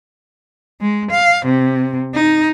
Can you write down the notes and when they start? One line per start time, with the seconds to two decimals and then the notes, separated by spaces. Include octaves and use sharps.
0.81 G#3
1.11 F5
1.46 C3
2.14 D#4